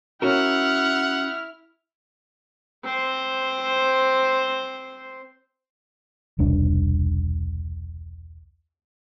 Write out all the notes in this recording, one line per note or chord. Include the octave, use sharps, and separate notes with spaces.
C#4 E4 F#4 A#4 F#5 F6
C4 C5
E1 C2 D4